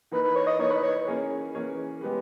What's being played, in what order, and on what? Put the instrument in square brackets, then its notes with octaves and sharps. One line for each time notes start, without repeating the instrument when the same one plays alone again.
[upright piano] E3 A#3 D#4 [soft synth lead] B4
[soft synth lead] B4
C#5
D#5
[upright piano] E3 A#3 D#4 [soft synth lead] C#5
[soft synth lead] B4
C#5
[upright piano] E3 A#3 C#4 G#4 C#5
E3 A#3 C#4 G#4 C#5
G#3 B3 G4 B4